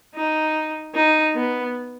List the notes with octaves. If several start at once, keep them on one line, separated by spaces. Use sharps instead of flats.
D#4
D#4
B3